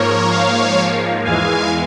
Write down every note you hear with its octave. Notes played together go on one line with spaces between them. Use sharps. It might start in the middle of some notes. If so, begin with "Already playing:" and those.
Already playing: G#2 F3 A#3 A#4 C#5
C#5 F5
E2 E3 G#3 F5 G#5